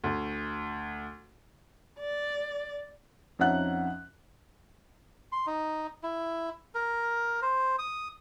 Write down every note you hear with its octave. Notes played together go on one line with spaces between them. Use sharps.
D2
D5
F2 C#4 D#4 E5 F#5 F#6
C6
D#4
E4
A#4
C5
D#6